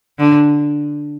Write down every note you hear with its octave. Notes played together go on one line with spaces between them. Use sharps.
D3